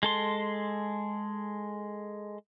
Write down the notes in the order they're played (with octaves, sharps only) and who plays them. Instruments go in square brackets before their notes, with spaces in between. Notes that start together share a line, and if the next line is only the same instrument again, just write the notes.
[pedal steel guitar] G#3 A4 C6